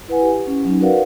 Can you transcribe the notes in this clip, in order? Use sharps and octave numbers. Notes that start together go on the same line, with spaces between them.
E4 B4 F#5 G#5
G4
C#4
F#3 C#4 D#4
F#4 A#4 B4 D5 F5 F#5